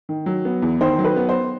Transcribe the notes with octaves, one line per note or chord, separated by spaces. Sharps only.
D#3
F#3
B3
E2
D#3 C5
F#3
B4
B3
C5